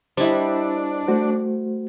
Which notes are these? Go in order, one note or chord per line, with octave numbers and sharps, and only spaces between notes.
G3 D4 E4 C5 D#5
A3 F#4 C5